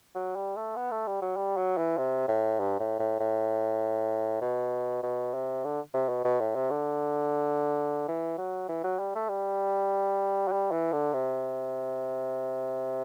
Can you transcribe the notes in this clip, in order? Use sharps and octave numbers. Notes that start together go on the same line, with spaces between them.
F#3
G3
A3
B3
A3
G3
F#3
G3
F#3
E3
C3
A2
G2
A2
A2
A2
B2
B2
C3
D3
C3
B2
B2
A2
C3
D3
E3
F#3
E3
F#3
G3
A3
G3
F#3
G3
E3
D3
C3